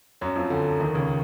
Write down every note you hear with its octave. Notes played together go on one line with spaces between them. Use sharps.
F#2 F#3
F2 F3
D2 D3
D#2 D#3
C#2 C#3